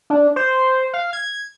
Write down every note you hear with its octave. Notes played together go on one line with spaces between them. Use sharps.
D4
C5
F5
G#6